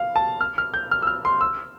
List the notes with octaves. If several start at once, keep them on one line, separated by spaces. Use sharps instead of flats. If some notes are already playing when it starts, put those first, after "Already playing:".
Already playing: F5
A5
F6
F6
G6
F6
E6
F6
C6
E6